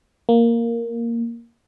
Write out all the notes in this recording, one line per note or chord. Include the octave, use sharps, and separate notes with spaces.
A#3